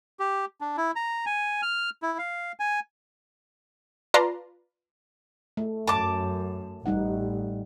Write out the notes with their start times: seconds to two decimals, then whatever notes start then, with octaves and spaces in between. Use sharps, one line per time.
0.19 G4
0.61 D4
0.77 E4
0.96 A#5
1.26 G#5
1.62 F6
2.02 E4
2.18 F5
2.60 G#5
4.14 F4 B4 D5 A5 A#5 C6
5.57 A3
5.88 F#2 A5 D6
6.86 A1 G3 D#4 F#5